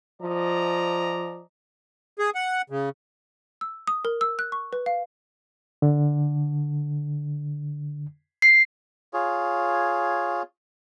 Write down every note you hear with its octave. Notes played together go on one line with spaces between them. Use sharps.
F3 D5 D#5 A#5
G#4
F#5
C#3
E6
D#6
A#4
E6
F#6
C#6
B4
F5
D3
C7
F4 G#4 C#5